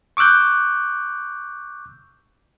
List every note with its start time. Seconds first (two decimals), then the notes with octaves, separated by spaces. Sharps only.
0.17 C#6 D6 E6 F#6 G6